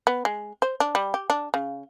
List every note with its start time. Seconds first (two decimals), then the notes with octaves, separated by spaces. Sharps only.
0.07 B3
0.25 G#3
0.62 C5
0.80 D4
0.95 G3
1.14 G4
1.30 D4
1.54 C#3